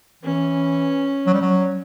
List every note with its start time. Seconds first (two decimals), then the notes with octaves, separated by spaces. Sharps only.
0.23 E3 C#4
1.27 F#3
1.34 G3
1.41 F#3